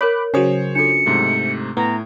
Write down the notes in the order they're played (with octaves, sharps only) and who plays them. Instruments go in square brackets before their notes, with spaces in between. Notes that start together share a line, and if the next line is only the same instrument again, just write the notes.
[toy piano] A#4 C#5 [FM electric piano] B5 D6 F#6
[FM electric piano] C#3 F#3 [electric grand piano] C5 C#5 [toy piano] G#5 D#6
[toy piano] D4 F4 A4 [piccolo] C#7
[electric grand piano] G#2 C3 A3
[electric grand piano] A2 [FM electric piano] B3 [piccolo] A#5